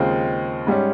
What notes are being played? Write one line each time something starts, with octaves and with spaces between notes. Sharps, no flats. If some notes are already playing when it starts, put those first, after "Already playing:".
Already playing: D#2 C#3 G#3 C4 F4
G#2 G3 C#4